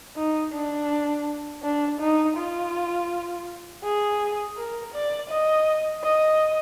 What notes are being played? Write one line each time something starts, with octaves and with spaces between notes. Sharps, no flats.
D#4
D4
D4
D#4
F4
G#4
A#4
D5
D#5
D#5